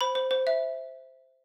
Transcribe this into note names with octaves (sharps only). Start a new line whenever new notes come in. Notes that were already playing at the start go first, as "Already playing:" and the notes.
C5 B5
C5
C5
E5